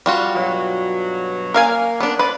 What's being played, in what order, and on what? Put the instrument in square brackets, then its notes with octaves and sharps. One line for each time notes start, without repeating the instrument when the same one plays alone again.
[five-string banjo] G3 F4 F#4
[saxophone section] G2 B2 F#3
[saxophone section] A#3 [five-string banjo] A#4 F5 G#5
[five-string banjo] B3 D4
[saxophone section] F3 C5 D5 [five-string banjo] B4